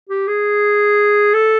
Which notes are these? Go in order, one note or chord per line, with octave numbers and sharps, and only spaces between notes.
G4
G#4
A4